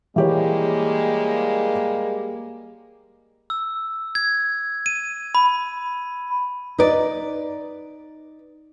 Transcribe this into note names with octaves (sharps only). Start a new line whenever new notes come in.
E3 G3 G#3 A#3 G4 C#5
E6
G#6
D#7
B5
D#4 B4 D5